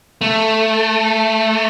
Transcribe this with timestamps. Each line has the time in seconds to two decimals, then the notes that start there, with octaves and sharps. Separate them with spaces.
0.21 A3